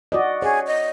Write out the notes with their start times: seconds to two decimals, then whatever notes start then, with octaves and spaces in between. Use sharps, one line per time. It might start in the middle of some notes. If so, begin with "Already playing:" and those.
0.12 F#4 D5 D#5
0.42 G#4 C#5
0.67 D#5